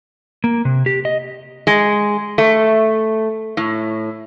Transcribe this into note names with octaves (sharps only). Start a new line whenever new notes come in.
A#3
C3
G4
D#5
G#3
A3
A2